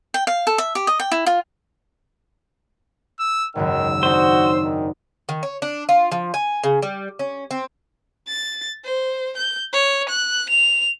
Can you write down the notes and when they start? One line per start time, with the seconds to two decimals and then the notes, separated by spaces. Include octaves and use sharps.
0.14 G5
0.27 F5
0.47 A4
0.58 E5
0.75 G4
0.87 D#5
1.00 G5
1.12 E4
1.26 F4
3.20 E6
3.55 G#1 C#2 F#2 D#3 E6
4.03 C4 D4 D#4 F#4 C5
4.63 D#3
5.29 D#3
5.43 C#5
5.62 D4
5.89 F4
6.12 F3
6.34 G#5
6.64 C#3
6.82 G3
7.19 C#4
7.51 C4
8.27 A6
8.85 C5
9.37 G6
9.73 C#5
10.09 F#6
10.49 F7